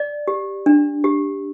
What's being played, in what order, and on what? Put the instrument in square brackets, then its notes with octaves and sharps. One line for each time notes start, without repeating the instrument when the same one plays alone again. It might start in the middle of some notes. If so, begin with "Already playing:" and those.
Already playing: [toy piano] D5
G4
D4
G4